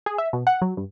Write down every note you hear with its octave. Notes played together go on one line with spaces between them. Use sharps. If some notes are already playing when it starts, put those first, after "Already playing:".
G#4
E5
B2
F#5
F#3
G2